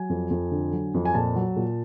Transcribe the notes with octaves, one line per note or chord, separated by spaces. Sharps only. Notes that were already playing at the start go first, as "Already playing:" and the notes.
Already playing: F#3 G#5
F2
F2
D3
F#3
F2
G#5
A#2 A5
F#3
A#2